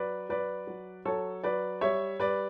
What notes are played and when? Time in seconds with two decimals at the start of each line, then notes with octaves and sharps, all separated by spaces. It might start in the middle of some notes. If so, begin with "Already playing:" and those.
Already playing: F#3 B4 D5
0.29 F#3 B4 D5
0.67 F#3
1.05 F#3 A4 C#5
1.44 F#3 B4 D5
1.81 G3 C#5 E5
2.19 G3 B4 D5